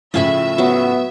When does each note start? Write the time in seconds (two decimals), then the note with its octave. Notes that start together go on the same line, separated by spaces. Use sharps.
0.14 A2 C#3 F3 F4 E5 G#5 B5
0.58 F#3 B3